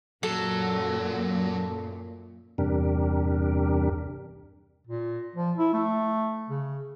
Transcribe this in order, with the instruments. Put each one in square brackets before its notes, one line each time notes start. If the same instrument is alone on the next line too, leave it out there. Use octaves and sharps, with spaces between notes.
[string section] F#2 A#2 [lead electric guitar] F#3 [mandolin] A4
[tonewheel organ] E2 G2 C3 D4 G4 A#4
[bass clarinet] A#2
F3
E4
A3
C#3